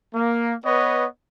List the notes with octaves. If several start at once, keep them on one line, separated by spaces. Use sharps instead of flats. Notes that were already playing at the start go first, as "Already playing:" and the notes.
A#3
B3 B4 C#5 D#5